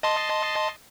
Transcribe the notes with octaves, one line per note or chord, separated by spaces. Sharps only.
D#5 A5 C6